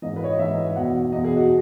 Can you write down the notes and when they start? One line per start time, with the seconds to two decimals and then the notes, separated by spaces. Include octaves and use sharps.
0.02 G#2 E3 D#5
0.16 B4
0.24 C#5
0.31 D#5
0.39 G#2 E3 E5
0.76 E2 B2 F#5
1.12 E2 B2 D#5
1.24 G#4
1.37 F#4